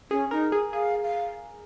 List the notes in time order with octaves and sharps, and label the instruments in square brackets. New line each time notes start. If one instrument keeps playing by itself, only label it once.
[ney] C#4 [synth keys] G#4
[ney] D#4 [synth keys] A#4
[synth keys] G#4
[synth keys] G#4 [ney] F5
[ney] F5